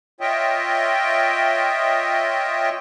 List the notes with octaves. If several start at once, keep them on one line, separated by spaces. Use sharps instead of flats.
F4 C#5 D#5 E5 G5